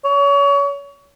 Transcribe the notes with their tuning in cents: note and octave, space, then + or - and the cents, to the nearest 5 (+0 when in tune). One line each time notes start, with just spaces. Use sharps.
C#5 +30